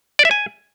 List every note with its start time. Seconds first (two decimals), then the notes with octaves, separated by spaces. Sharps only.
0.19 D5
0.25 E5
0.31 G#5